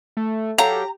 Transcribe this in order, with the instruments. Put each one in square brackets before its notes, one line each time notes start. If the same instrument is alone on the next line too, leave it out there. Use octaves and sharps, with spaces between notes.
[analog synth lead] A3
[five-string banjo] F#3 F5 [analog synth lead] G4 [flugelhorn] A4 [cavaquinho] A#5